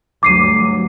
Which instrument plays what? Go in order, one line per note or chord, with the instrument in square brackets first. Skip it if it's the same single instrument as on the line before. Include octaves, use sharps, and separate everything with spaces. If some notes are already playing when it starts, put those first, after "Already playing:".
[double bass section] D2 G2 F#3 [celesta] D6 C7 D#7